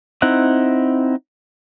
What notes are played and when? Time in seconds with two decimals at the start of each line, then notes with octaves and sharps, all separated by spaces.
0.22 C4 D#4 E4 F#5